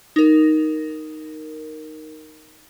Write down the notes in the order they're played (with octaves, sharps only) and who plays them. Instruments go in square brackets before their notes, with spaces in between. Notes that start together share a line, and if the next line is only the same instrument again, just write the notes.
[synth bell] D#4 A#4